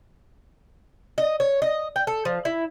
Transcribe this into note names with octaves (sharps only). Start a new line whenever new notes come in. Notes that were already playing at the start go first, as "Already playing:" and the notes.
D#5
C#5
D#5
G5
A4
F3
E4